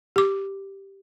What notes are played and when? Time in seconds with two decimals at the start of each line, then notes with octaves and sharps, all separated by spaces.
0.16 G4 D6